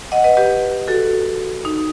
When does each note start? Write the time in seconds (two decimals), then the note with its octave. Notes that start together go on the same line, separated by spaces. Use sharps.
0.12 D#5 F#5
0.24 B4 D#5
0.37 G4 B4
0.88 F#4 A4
1.65 D#4